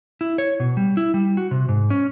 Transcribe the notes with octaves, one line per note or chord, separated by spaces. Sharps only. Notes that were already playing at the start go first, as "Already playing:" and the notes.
E4
C#5
B2
G3
E4
G3
F#4
C3
G#2
C#4